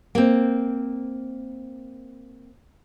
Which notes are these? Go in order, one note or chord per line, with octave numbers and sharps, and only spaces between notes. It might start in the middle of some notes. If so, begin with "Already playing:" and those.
A#3 C4